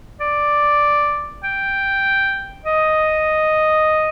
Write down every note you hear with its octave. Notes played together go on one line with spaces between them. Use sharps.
D5
G5
D#5